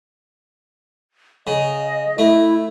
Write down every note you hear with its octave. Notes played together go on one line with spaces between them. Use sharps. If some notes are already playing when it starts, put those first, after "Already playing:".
C#3 D#5
A3 E4